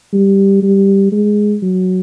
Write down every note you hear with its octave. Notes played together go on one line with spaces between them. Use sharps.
G3
G3
G#3
F#3